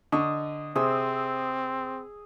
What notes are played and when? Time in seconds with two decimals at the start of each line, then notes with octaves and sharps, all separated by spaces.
0.12 D3 D#5 C#6
0.75 C3 C4 G#4 E6